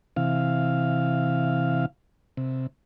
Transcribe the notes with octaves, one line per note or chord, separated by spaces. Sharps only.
C3 E3 F5
C3